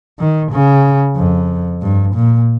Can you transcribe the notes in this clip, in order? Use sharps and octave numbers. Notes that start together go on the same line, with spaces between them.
D#3
C#3
F2
G2
A#2